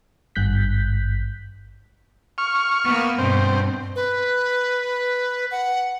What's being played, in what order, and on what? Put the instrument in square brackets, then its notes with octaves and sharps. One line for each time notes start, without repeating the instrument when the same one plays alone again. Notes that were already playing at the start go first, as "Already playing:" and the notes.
[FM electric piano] G#1 G2 F#6 G6 B6
[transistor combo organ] C#6 F6
[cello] A#3 B3
[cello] G2 B2 [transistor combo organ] C4
[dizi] B4
F#5